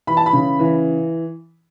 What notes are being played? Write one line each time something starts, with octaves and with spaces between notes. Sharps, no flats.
E3 B5
A5
B5
C#3
E3